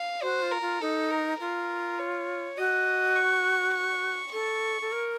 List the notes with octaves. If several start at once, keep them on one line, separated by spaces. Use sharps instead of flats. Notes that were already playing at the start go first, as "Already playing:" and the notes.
Already playing: F5
F#4 C5
F4
A#4
F4
D#4 A4
A#4
F4 A#4
C#5
F#4 D#5
C#6
C#6
A4 C#6
A4
A#4